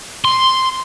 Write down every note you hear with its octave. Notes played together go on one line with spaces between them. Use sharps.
C6